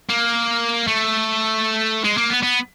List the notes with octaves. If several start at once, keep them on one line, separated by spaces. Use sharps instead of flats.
A#3
A3
G#3
A#3
B3
B3